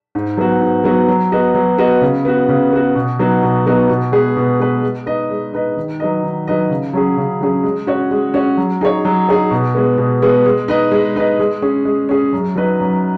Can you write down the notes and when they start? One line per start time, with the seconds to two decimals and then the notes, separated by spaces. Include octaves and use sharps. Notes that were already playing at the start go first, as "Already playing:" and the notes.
0.15 G#2
0.37 F#3 B3 F#4
0.61 G#2
0.84 F#3 B3 F#4
1.08 F#3
1.32 B3 F#4 D#5
1.55 F#3
1.78 B3 F#4 D#5
2.01 C#3
2.25 B3 F#4
2.49 C#3
2.73 B3 F#4
2.95 B2
3.19 F#3 B3 D#4 F#4
3.43 B2
3.66 F#3 B3 D#4 F#4
3.90 B2
4.12 G#3 B3 G#4 B4
4.37 B2
4.59 G#3 B3 G#4 B4
4.83 G#3
5.06 D#4 B4 D#5
5.30 G#3
5.53 D#4 B4 D#5
5.77 D#3
6.00 F#3 D#4 B4 D#5
6.24 D#3
6.47 F#3 D#4 B4 D#5
6.70 C#3
6.93 F#3 C#4 G#4
7.17 C#3
7.41 F#3 C#4 G#4
7.64 G#3
7.87 C#4 F#4 C#5
8.11 G#3
8.34 C#4 F#4 C#5
8.57 F#3
8.81 D#4 G#4 C#5
9.05 F#3
9.29 D#4 G#4 C#5
9.51 B2
9.75 G#3 B3
9.98 B2
10.22 G#3 B3
10.46 G#3
10.68 D#4 B4 D#5
10.92 G#3
11.16 D#4 B4 D#5
11.40 G#3
11.62 C#4 G#4
11.85 G#3
12.09 C#4 G#4
12.33 F#2
12.56 F#3 D#4 B4 D#5
12.80 F#2